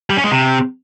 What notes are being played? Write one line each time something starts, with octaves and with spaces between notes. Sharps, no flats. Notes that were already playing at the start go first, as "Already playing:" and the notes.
G3
C#4
G#3
C3